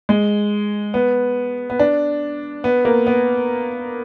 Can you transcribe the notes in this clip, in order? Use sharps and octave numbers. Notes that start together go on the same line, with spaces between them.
G#3
B3
B3
D4
B3
A#3
B3